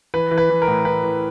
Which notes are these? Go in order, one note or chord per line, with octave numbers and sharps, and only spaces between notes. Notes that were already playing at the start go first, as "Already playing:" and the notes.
E3 B4
E3
B4
E3
A#4
A2
A2 B4
E3